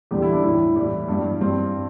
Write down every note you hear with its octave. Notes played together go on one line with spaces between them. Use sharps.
E2 D3 G3 G4
E4
D4
A2 G3 E4
A2 E3 G3
G2 E3 G3
G2 G3 C4